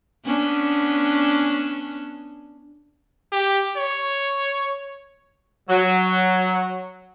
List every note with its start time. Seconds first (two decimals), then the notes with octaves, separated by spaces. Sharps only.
0.25 B3 C#4 D4
3.32 G4
3.77 C#5
5.70 F#3